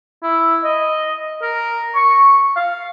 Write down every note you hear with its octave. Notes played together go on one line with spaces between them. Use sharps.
E4
D#5
A#4
C#6
F5